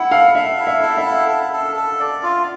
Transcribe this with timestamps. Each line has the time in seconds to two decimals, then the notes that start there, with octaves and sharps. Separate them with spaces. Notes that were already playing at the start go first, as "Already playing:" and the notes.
Already playing: E4 F#5
0.11 A4 F5
0.35 A4 E5
0.59 E4
0.67 E5
0.82 A4
0.97 E5
1.05 E4
1.29 A4
1.53 A4
1.76 A4
1.99 D5
2.23 F4